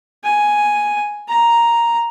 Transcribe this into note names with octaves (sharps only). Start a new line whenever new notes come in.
G#5
A#5